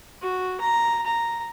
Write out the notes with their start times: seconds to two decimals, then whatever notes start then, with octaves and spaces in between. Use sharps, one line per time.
0.22 F#4
0.61 A#5
1.06 A#5